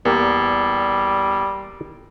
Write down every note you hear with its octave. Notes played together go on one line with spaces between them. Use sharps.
E2 G3 A#3 G4 A#4